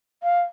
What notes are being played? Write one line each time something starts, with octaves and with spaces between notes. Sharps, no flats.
F5